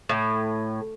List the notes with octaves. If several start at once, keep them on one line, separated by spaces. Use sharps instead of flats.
A2